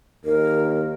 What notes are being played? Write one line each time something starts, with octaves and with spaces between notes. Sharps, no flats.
D#2 A#4